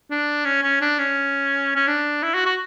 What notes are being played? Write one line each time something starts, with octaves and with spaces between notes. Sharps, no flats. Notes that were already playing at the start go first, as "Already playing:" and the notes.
D4
C#4
C#4
D4
C#4
C#4
D4
E4
F#4
F#4